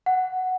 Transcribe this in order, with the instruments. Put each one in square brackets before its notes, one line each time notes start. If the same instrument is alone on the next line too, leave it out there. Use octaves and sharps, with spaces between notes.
[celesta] F#5